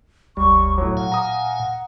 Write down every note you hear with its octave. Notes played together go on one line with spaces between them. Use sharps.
F#1 D2 G3 C#6
A2 F#3 C#5
A#2 F5 F#5 G#5
A#5 D#6